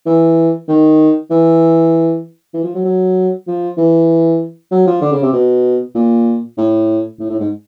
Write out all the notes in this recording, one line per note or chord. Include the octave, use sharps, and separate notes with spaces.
E3
D#3
E3
E3
F3
F#3
F#3
F3
E3
F#3
F3
D3
C#3
C3
B2
A#2
A2
A2
A2
G#2